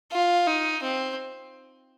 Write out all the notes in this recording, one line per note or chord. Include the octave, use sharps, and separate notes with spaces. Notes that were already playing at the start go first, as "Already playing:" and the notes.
F4
D#4
C4